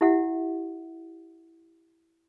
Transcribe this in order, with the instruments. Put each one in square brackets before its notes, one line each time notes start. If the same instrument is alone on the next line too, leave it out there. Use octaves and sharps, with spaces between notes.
[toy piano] E4 G4 E5 F#5